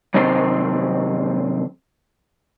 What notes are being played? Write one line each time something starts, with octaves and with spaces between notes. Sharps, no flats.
F#2 C3 D#3 C4 C5